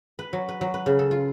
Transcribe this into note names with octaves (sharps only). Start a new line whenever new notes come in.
B4
F#3
B4
F#3
B4
C#3
A4
F4